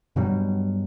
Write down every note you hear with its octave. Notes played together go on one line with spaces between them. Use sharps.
G2 B2 F#3 G3